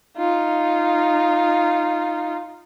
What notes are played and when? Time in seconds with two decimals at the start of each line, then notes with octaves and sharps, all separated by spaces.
0.17 D#4 F4